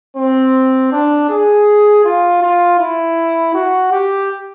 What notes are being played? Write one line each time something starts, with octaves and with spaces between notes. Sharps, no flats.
C4
D4
G#4
F4
F4
E4
F#4
G4